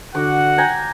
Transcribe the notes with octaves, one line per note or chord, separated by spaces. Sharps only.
D3 F#4 F#5 D6
G5 G#5 A#5